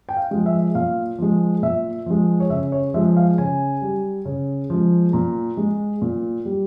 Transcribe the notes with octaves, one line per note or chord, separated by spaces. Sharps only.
G5
F5
F3 G#3
E5
A#2 F5
F3 G#3
A#2 E5
F3 G#3
C#5
C#3 E5
C#5
F3 G#3 E5
F5
C#3 G#5
G3
C#3
F3 G#3
A#2 A#5
G#3
A#2
G3